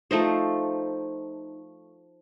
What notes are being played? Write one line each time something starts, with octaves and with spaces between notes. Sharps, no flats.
F3 A3 D#4 C5